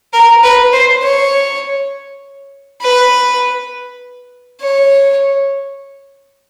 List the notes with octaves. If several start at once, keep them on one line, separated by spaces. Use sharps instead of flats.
A#4
B4
C5
C#5
B4
C#5